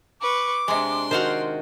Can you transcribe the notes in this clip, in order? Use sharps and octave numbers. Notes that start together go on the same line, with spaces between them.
B4 C#6 D6
C3 G#3 D4 C6
D#3 F#4 C5 F5 F#5